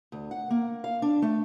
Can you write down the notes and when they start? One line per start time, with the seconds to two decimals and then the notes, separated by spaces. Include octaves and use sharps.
0.12 D2
0.31 F#5
0.51 A#3
0.84 F5
1.02 D4
1.22 A3